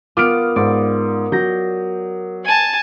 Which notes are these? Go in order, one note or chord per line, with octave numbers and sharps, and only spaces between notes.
B3 F4 A#4 D6 D#6 F6 D7
G#2 D5
F#3 G6 A#6
G#5 A5